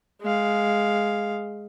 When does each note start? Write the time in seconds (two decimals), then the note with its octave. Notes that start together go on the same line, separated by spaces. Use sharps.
0.22 G#3 F5